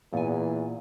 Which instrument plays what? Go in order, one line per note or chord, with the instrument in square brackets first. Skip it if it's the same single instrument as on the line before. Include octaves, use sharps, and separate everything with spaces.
[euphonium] E2 [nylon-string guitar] A#2 G#5